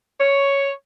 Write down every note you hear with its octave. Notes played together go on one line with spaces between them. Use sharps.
C#5